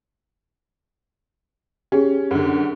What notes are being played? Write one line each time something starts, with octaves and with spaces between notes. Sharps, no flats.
C#4 G4 G#4
F#2 D3